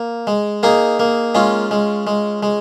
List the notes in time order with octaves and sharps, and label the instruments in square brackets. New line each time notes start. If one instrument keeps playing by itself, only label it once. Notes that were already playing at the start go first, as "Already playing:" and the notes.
Already playing: [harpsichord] A#3
G#3
A#3 D#4 G#4
A#3
G#3 C#4 F4
G#3
G#3
G#3